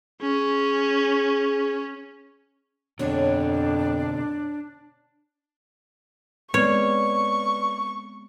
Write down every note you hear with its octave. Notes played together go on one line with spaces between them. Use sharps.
C#4 G#4
F2 B2 D3 D4 C#5
G#3 B3 C4 B4 C#5 D5 C#6